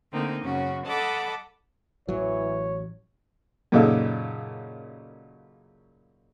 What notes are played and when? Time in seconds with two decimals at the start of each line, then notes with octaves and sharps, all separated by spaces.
0.12 D3 A3 A#3 C4 D#4
0.44 F#2 C#3 C#4 F#4
0.87 A4 D#5 F#5 A5 B5 D6
2.09 A1 E3 F#3 C#5
3.72 F#2 A#2 C#3 D#4 A4